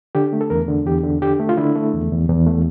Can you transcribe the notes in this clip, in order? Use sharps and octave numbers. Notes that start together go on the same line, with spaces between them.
D3 G4
A3
A4
E2 A#4
D3
E2 G4
D3
D3 G4
A3
F4
D3 E4
A3
E2
E2
E2
A3